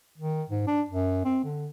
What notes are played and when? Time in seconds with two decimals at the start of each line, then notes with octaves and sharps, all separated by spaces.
0.18 D#3
0.50 G#2
0.67 D4
0.89 F#2
1.25 C4
1.44 D3